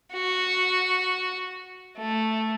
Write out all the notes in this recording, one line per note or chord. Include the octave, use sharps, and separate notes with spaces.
F#4
A3